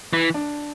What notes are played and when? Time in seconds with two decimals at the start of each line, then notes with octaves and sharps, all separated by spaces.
0.13 E3
0.34 D4